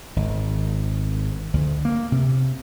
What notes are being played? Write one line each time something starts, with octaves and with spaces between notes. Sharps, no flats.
G#1
D2
A#3
C3